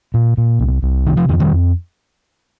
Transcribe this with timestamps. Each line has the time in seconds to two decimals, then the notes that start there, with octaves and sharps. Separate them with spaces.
0.14 A#2
0.37 A#2
0.59 C2
0.82 C2
1.06 C3 D#3
1.17 F3
1.29 F2 D#3
1.40 D#3 G3
1.52 F2